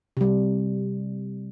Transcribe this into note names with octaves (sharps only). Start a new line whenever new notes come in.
C3 G3